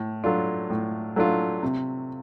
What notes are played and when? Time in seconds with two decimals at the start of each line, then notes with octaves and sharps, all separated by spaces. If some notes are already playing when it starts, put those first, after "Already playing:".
Already playing: A2
0.24 F#3 A3 D4 F4
0.70 A2
1.16 F#3 A3 D4 F4
1.63 C3